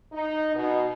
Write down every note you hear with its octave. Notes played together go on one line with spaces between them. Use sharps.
D#4
B2